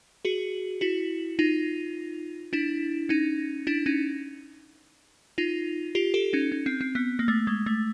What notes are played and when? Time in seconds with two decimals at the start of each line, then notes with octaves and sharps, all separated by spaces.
0.25 F#4 G#4
0.81 E4 F#4
1.39 D#4 F4
2.53 D4 E4
3.09 C#4 D#4
3.67 D4 E4
3.86 C#4 D#4
5.38 D#4 F4
5.95 F4 G4
6.14 G4 A4
6.33 C#4 D#4
6.52 C#4
6.66 C4
6.81 C4
6.95 B3
7.19 A#3
7.28 A3
7.47 G#3
7.66 A3